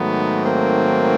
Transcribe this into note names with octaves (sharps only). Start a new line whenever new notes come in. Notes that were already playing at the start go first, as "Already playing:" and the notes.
Already playing: G#2 D#3 F#3 A3 B3
A#3 C4